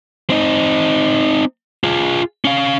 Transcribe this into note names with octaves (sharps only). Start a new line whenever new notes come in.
C4 D#4
F4 G#4
C#4 F5